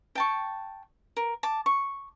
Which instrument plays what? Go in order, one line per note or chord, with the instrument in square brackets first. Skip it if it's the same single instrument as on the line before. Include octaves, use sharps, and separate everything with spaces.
[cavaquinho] G5 A5 C#6
A#4
A5 D6
C#6